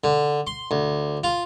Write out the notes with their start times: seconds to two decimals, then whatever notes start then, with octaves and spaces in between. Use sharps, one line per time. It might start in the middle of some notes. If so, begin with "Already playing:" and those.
0.04 D3
0.47 C6
0.71 D2
1.24 F4